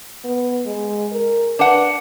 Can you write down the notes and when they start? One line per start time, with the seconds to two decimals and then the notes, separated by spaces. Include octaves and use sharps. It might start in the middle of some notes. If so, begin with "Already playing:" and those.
0.25 B3
0.66 G#3
1.12 A#4
1.59 D4 B4 F#5